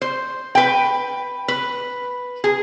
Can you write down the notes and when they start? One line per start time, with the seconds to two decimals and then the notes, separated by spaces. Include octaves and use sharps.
0.02 C5
0.55 B4 G5
1.48 B4
2.44 G#4